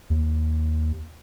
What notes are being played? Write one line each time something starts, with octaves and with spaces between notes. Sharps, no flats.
D#2